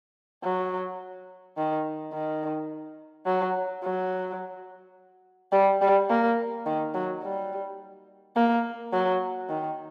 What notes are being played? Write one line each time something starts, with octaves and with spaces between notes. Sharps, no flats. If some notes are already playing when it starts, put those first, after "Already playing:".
F#3
D#3
D#3
F#3
F#3
G3
G3
A#3
D#3
F#3
G3
A#3
F#3
D#3